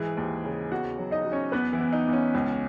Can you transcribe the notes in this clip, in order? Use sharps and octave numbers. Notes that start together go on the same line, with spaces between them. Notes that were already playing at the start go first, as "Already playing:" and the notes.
Already playing: G#2 E3 G#4
D#2
C#3
E2 F#4 F#5
F#3
D#4 D#5
F#3
C#4 C#5
E2 B3 B4
E3 E4
E2
D#4
E2
C#4
C#2